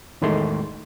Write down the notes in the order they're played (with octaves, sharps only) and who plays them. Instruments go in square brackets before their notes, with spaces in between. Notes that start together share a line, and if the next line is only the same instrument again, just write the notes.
[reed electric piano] E2 A2 D#3 G#3 A3 C6